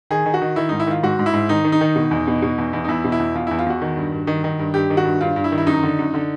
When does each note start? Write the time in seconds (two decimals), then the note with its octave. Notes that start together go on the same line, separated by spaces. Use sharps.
0.11 D#3 G#4
0.26 D#3
0.34 F#4
0.42 D#3
0.56 D#3 E4
0.69 G#2 D#4
0.80 E4
0.87 D#3 F4
1.03 G#2 F#4
1.19 G#2
1.26 E4
1.33 G#2
1.49 D#3 D#4
1.64 D#3
1.72 D#4
1.81 D#3
1.96 B2
2.11 E2
2.27 B2
2.42 B2
2.58 E2
2.73 E2
2.84 D#4
2.88 E2 E4
3.04 B2
3.12 E4
3.20 E2
3.35 E2 F4
3.47 E2 E4
3.59 F4
3.66 E2 F#4
3.82 D#3
3.97 G2
4.12 G2
4.27 D#3
4.44 D#3
4.59 G2
4.74 G2 G4
4.90 D#3
4.97 F#4
5.05 G2
5.21 G2 F4
5.36 G2
5.44 E4
5.52 D#3
5.58 E4
5.67 F#2 D#4
5.83 D3
5.99 F#2
6.14 D3